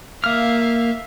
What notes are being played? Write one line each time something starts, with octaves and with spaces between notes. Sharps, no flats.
A#3 E5 F5 F6